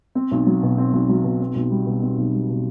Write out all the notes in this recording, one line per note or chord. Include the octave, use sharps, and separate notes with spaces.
C4
B1
F#3
B2
C4
B1
F#3
B2
C4
B1
G3
B2
C4
B1
G3
B2